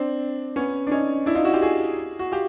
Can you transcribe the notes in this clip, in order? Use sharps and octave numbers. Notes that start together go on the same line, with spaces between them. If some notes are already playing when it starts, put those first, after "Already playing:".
Already playing: C4 D4
B3 C#4
D4
C#4 D#4
D4 E4
D#4 F4
E4 F#4
F4 G4
F#4 G#4
F#4
F4 G4